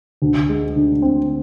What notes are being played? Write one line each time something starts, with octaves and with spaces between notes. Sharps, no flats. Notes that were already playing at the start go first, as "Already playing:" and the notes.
D2
G#3
D3
C4